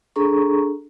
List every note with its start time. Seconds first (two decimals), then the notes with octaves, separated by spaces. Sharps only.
0.16 D4 G#4 A4 A#5 C#6